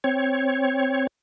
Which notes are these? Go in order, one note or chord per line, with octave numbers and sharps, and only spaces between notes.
C4 C#5